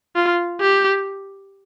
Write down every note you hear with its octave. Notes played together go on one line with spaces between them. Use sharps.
F4
G4